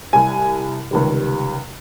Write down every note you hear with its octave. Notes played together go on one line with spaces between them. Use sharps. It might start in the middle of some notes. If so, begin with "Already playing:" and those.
C2 C3 G3 G#5
C#2 C3 D#3 G3